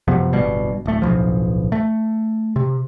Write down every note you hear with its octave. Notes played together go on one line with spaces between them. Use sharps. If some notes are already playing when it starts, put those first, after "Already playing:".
F#2 C3 F3 B3
D1 G1 B2 G3
D1 A3
D1 B1 F3
A3
C3